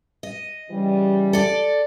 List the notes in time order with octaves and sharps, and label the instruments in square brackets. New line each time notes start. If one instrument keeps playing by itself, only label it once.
[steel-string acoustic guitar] D#5
[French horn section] C#3 E3 G3
[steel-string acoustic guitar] A4 D5